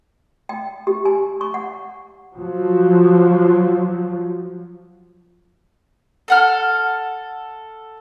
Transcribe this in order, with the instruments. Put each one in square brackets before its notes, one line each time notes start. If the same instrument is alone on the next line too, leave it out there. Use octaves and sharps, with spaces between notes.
[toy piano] G5
G4
G#5
C#6
F#5
[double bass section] F3 F#3
[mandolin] A4 F#5 F6